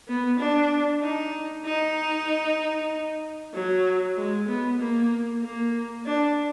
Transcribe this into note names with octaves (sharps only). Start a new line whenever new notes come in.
B3
D4
D#4
D#4
F#3
G#3
B3
A#3
A#3
D4